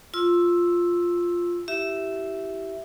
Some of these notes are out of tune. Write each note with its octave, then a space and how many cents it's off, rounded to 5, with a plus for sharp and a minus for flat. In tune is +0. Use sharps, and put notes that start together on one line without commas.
F4 +0 C6 +20 E6 +0
E4 +0 G4 -20 E5 +0